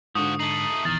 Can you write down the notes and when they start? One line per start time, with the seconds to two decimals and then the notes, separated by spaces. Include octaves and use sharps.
0.15 G#2 D3 F3 F#4 D#6
0.39 A3 D#4 C7 F#7
0.85 A#1 E2 D#3 A6